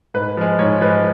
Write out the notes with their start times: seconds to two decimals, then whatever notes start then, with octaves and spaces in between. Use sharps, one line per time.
0.14 G#2 B4
0.37 F3 G#3
0.59 G#2 C#5
0.81 F3 G#3 B4